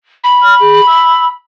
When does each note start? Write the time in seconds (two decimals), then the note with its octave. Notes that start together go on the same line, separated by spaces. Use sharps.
0.24 B5
0.42 F6
0.60 G#4
0.87 E6